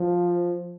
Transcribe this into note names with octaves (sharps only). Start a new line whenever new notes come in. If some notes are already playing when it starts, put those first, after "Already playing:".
Already playing: F3